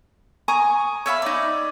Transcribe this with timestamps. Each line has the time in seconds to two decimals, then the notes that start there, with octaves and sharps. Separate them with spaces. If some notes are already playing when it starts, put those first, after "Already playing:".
0.48 G#5 A#5 C#6 D#6
1.06 C#5 E5 F5 B5
1.22 D#4 D5